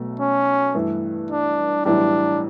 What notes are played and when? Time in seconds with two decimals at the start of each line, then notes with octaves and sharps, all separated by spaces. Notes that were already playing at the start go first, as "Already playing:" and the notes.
Already playing: B1 B2 A3
0.20 C#4
0.74 G2 E3 A3
1.30 D4
1.85 B1 A2 E3 G3 D4